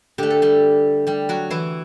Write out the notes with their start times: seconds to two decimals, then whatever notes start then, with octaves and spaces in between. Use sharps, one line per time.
0.18 D3 A3 G4
0.30 A4
0.42 G3 G4
1.07 G3 G4
1.29 F#3 F#4
1.51 E3 E4